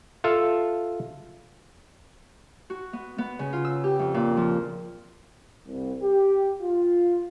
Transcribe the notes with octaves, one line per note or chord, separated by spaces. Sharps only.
F4 A4 E5 F5 A5
F#4
B3
B3
C#3
F4
E6
G4
F2
A#2
F3
C2
G4
F4